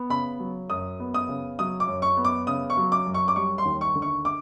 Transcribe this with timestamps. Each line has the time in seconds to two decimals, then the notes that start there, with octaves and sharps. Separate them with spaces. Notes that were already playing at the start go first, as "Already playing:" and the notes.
Already playing: B3
0.10 C#3 B5
0.39 F#3
0.70 F#2 D#6
1.00 B3
1.14 D#6
1.28 C#3
1.59 F#3 D#6
1.80 D6
1.88 F#2
2.02 C#6
2.17 B3
2.25 D6
2.47 C#3 D#6
2.70 C#6
2.77 F#3
2.92 D6
3.06 F#2
3.14 C#6
3.28 D6
3.36 G3 C#6
3.58 C6
3.65 D#2
3.81 C#6
3.95 D3
4.02 C#6
4.25 D6